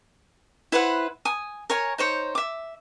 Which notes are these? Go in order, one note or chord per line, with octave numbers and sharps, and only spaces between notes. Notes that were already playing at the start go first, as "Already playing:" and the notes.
E4 B4 C5 F#5
G#5 D#6
A#4 C#5 G#5
D#4 C5 C#5
E5 D6